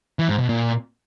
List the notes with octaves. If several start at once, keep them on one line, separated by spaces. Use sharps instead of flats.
E3
G#2
B2
A#2